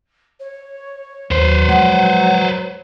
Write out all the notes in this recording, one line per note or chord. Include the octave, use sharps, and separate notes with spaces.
C#5
D#2 F#3 B4 C5
F3 G#3 F#5